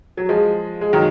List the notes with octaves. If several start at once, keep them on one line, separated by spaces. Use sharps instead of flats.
F#3
F3 G#3
G#3
D#3 F#3